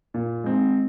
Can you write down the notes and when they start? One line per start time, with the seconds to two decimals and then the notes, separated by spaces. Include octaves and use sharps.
0.14 A#2
0.44 G#3 C4 D#4